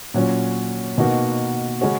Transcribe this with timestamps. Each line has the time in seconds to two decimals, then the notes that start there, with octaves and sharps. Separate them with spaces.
0.14 A#2 F#3 C#4
0.98 B2 A#3 D#4 F#4
1.81 C#3 G#3 C#4 F#4